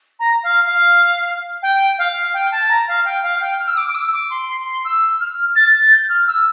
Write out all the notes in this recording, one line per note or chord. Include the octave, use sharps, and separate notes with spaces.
A#5
F5
F5
G5
F5
G5
A5
A#5
F5
G5
F5
G5
F6
E6
D6
D6
E6
D6
C6
C6
E6
F6
A6
G6
F6
E6